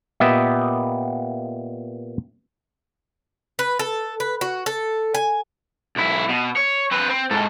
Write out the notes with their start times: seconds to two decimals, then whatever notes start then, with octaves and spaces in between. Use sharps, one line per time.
0.20 A#2 B3 G4 D#5 E5
3.59 B4
3.79 A4
4.20 B4
4.41 F#4
4.66 A4
5.14 G#5
5.96 B1 E4
6.29 B2
6.57 C#5
6.92 C4 B4
7.10 C4
7.31 G#2 A4